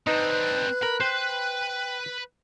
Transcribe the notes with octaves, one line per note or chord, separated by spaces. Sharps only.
C4 D4 D#4 B4 F#6
A#4 B5
B4 C5 G5